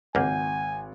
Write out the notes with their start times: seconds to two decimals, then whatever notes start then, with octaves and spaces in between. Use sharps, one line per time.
0.15 G#1 C#2 A#3 F#5 G#5 G6